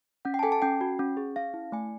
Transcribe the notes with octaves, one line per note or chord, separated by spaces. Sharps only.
C#4 F#5
G5
A5
A4 G#5
A5
C#4 G5
F#4
C#4
G#4
C#4 F5
E4
A3 G#5